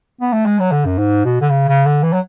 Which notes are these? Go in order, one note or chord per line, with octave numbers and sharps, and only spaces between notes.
B3
A3
G#3
F#3
D3
F#2
G#2
B2
D3
C#3
C#3
D3
E3
F#3